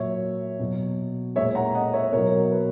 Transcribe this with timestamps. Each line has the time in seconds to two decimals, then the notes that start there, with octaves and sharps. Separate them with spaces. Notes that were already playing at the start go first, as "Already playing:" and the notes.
Already playing: A#2 F#3 C#5 E5
0.60 B2 F#3
1.36 A#2 G#3 C#5 E5
1.55 F#5 A#5
1.75 D#5 F#5
1.93 C#5 E5
2.12 B2 F#3 A#4 C#5
2.51 B4